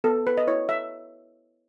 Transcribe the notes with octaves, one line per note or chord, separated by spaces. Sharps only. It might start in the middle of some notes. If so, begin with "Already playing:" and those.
B3 A4
B4
D#5
E4 C#5
E5